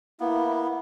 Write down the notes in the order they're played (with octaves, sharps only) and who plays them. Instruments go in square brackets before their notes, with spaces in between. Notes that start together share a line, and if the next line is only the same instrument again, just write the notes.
[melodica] A#3 B3 [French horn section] E4